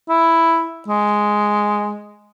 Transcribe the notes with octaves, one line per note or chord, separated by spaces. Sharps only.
E4
G#3